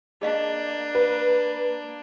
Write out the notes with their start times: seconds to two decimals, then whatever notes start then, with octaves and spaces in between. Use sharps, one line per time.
0.22 A#3 D4 G#4 D#5 F5
0.95 B4